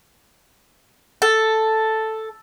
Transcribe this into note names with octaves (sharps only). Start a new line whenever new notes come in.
A4